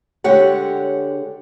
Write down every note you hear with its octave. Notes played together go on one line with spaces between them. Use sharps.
D3 G#3 G4 C#5 F#5